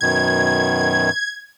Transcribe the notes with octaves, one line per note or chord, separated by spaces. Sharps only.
F#2 B2 D#3 G#6